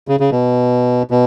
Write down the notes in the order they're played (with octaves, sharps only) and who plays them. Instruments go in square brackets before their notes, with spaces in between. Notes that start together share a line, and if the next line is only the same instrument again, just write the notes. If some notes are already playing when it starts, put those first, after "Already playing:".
[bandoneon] C#3
C#3
B2
B2